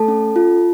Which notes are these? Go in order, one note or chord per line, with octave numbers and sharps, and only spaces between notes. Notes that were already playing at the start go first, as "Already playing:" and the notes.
Already playing: A3 A4 A5
C#4
F4